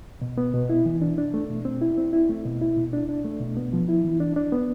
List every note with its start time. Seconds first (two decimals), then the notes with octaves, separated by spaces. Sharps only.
0.22 B2
0.38 B3
0.54 B2
0.69 E4
0.86 E3
1.02 D4
1.18 D4
1.34 A3
1.49 B2
1.65 C4
1.81 E4
1.97 C4
2.13 E4
2.29 A3
2.45 B2
2.62 E4
2.77 B2
2.93 D4
3.09 D4
3.25 A3
3.40 B2
3.57 B3
3.73 F3
3.88 E4
4.04 E3
4.20 D4
4.36 D4
4.52 B3